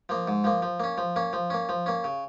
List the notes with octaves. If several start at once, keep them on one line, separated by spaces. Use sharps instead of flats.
F3 A#3
G#2
F3 A#3
F3
A#3 C#4
F3
A#3 C#4
F3
A#3 C#4
F3
A#3 C#4
C#3